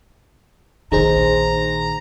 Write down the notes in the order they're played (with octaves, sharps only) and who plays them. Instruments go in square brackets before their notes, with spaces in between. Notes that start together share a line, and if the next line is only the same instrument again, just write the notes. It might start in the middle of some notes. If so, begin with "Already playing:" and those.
[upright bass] A#1 D#3 [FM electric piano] D#4 G#4 C5 [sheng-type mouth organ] A#5